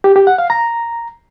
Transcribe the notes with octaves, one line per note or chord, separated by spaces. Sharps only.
G4
G4
F#5
F5
A#5